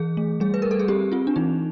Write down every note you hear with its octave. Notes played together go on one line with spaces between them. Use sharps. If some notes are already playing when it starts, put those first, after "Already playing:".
Already playing: E3 G#4
A3
G3 G#4
B4
G3 A#4
A4
G#4
C4 G4
C4 F4
D4
E3 D#4